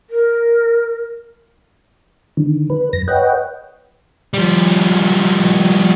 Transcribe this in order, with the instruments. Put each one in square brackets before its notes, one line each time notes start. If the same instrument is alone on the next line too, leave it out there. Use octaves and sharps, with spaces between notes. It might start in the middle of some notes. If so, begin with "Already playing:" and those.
[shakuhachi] A#4
[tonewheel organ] D3 D#3
B4
F#2 A#6
B4 C#5 D#5 F#5 G5
[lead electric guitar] F3 G3